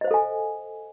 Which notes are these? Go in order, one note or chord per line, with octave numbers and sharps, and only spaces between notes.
A4 C5 D#5 F5 G#5